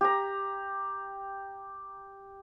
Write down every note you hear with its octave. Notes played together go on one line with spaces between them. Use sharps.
G4 A#5